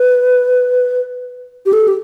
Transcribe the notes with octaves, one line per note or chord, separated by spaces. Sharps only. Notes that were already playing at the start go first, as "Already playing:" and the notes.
Already playing: B4
G4
A4
G4